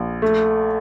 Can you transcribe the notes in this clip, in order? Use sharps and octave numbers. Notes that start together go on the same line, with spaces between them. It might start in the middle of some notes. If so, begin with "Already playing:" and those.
Already playing: A#1
A3